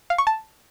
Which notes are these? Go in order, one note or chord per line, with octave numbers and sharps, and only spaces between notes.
F5
C#6
A5